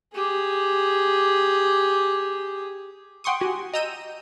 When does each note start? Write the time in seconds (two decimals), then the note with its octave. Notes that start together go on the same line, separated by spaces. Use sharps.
0.14 G4 G#4
3.24 F#5 G5 C6 C#6 D#6
3.41 F#4 G4 G#5
3.73 D#5 A#5 E6 G6 D#7